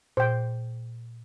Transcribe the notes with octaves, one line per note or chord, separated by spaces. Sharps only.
A#2 C5 G5